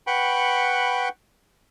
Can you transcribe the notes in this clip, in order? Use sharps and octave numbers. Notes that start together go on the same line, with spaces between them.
B4 F#5 G5 B5 C#6